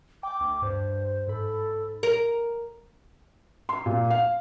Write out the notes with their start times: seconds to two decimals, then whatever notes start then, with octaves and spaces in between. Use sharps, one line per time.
0.23 G5 D6
0.40 D2
0.62 G2 C5
1.28 G#2 A4 B5
2.03 A#4
3.69 C6
3.86 A#2
4.10 F5